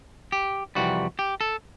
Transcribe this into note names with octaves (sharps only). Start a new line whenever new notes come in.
G4
F2 C3 E3 G3 F#4
G4
A4